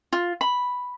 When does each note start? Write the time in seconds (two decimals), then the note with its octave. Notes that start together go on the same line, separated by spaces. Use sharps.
0.13 F4
0.41 B5